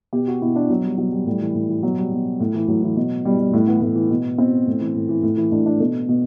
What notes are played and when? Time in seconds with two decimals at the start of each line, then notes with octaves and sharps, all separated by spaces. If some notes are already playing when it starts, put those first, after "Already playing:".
0.13 B2 G4
0.28 F#4
0.42 B2 E4
0.56 D4
0.70 B2 F#3
0.84 G3
0.98 B2 F#3
1.12 G3
1.26 A2 G3
1.41 E3
1.55 A2
1.69 E3
1.83 B2 F#3
1.98 G3
2.12 B2
2.40 A2
2.54 E3
2.68 A2 F#3
2.83 E3
2.96 B2
3.25 B2 G3
3.40 G3
3.53 A2 A3
3.67 E3 B3
3.81 A2 B3
3.96 E3
4.10 B2
4.38 B2 C4
4.67 A2
4.81 E3
4.95 A2
5.09 E3
5.23 A2
5.37 E3
5.52 A2 D4
5.66 E3 D4
5.80 B2 A4
6.08 B2